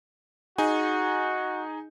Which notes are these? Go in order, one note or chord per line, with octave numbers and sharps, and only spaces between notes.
D#4 F#4 G#4 G#5